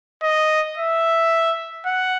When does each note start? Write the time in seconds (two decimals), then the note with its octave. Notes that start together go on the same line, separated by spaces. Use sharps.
0.23 D#5
0.78 E5
1.86 F#5